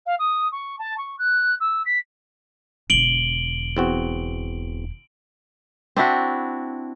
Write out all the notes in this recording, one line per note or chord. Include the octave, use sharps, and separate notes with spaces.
F5
D#6
C#6
A5
C#6
F#6
E6
B6
E1 D3 D7 F#7 G7
E2 C4 F#4
C4 D4 E4 F#4